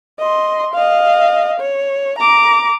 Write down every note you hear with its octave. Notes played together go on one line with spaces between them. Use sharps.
D#5 C6
D#5 F5
C#5
A#5 D6